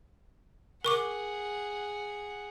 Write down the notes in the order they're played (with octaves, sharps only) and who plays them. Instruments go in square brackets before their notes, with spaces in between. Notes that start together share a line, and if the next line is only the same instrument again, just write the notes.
[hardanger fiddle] G#4 F#5 [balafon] A#4 C#6 D6